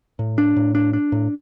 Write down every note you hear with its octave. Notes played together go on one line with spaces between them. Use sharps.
A2
D4
A2
D4
D4
A2